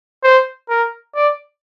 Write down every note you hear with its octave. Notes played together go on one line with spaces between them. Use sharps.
C5
A#4
D5